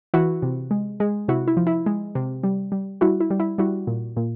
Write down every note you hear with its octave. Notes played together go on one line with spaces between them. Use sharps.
E3 E4 F#4
C3
G#3
G#3
C3 E4 F#4
E4
F3
E4
G#3
C3
G3
G3
G3 E4 F#4
E4
G3
E4
G3 E4 F#4
A#2
A#2